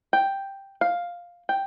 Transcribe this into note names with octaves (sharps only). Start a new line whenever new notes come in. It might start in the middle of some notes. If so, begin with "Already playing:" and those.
G5
F5
G5